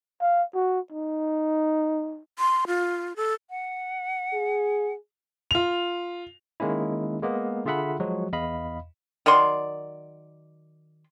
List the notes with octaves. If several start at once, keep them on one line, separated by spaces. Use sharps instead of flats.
F5
F#4
D#4
C6
F4
A4
F#5
G#4
F4 F7
D#3 G#3 A#3 C#4 E4
G#3 A#3 B3
D3 F4 G#4 E5 F#5 B5
F3 F#3 G#3 F#4
E2 D#5 F5 B5
D#3 F#3 D5 C6